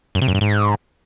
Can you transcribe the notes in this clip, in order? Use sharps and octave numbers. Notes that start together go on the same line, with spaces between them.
F#2
C3
F#2
G2
G#2